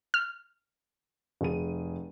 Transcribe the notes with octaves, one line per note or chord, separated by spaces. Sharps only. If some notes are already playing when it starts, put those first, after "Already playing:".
F6
F1 G#4 D#7